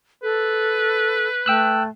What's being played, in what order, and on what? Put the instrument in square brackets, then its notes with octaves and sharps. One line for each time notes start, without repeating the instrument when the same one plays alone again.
[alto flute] A4 [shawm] B4
[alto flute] A3 [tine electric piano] G5 E6 F#6